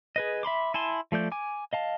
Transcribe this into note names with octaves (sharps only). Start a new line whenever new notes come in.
G#4 B4 D#5
E5 B5 C6 D6
E4 G#5 A5 C6
F3 A3 D5 G6
G#5 D6
D#5 F5 A5